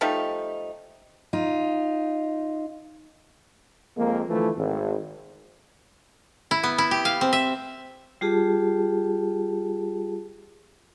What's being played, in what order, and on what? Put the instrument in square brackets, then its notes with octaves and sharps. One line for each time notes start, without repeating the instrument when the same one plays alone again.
[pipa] F3 G3 A3 D#4
[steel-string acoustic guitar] D#4 F4
[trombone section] F2 G#3 A#3
D2 E3 F3 A3
G#1
[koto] E4
B3
E4
G4
F5
C4
E5
[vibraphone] G3 F4 G4 G#4 A5